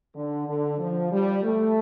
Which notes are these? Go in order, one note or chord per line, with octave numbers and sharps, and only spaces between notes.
D3
D3
F3
G3
A3